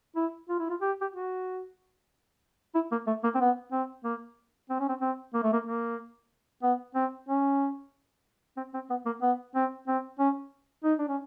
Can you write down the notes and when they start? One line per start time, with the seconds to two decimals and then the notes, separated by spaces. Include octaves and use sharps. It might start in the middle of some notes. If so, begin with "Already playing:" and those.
0.16 E4
0.49 F4
0.59 E4
0.70 F4
0.81 G4
1.01 G4
1.14 F#4
2.75 E4
2.92 A#3
3.07 A3
3.24 A#3
3.35 C4
3.40 B3
3.72 C4
4.04 A#3
4.70 C4
4.80 C#4
4.89 C4
5.01 C4
5.34 A#3
5.43 A3
5.53 A#3
5.67 A#3
6.63 B3
6.95 C4
7.29 C#4
8.57 C4
8.74 C4
8.90 B3
9.06 A#3
9.22 B3
9.55 C4
9.87 C4
10.19 C#4
10.84 D#4
10.99 D4
11.08 C#4